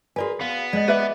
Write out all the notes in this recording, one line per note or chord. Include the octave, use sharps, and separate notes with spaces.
F#4 G#4 A#4 B4 D5 G#5
B3 F5
G#3 D5 D#5
G#4 B4 D5 E5